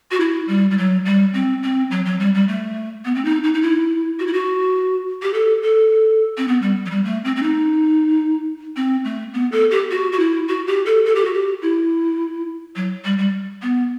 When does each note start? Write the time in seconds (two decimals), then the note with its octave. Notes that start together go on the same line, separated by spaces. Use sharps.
0.11 F#4
0.20 E4
0.48 G3
0.71 G3
0.78 F#3
1.05 G3
1.34 C4
1.63 C4
1.91 F#3
2.05 F#3
2.20 G3
2.35 G3
2.48 A3
3.05 B3
3.15 C4
3.25 D#4
3.44 D#4
3.54 D#4
3.62 E4
4.19 F#4
4.27 E4
4.33 F#4
5.22 G4
5.34 A4
5.63 A4
6.38 C4
6.48 B3
6.62 G3
6.86 F#3
6.91 G3
7.05 A3
7.25 C4
7.36 C4
7.43 D#4
8.76 C4
9.04 A3
9.34 B3
9.52 A4
9.71 G4
9.90 F#4
10.12 F#4
10.19 E4
10.48 F#4
10.67 G4
10.86 A4
11.05 A4
11.15 G4
11.25 F#4
11.34 G4
11.62 E4
12.76 F#3
13.05 G3
13.18 G3
13.62 B3